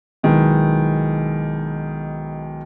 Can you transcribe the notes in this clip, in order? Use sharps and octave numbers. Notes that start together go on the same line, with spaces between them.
B1 D#3 G#3 E4 B4